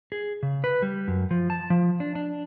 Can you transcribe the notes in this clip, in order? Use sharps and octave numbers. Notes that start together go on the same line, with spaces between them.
G#4
C#3
B4
G3
F#2
F3
A5
F3
D4
D4